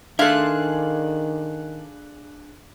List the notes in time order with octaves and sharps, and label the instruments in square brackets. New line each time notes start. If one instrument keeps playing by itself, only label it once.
[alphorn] D#3 [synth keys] D4 F#6 [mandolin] G#4 F5 C6 [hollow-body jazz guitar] A4 E5